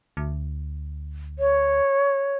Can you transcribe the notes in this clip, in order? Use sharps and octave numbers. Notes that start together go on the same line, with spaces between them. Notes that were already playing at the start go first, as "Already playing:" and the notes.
D2
C#5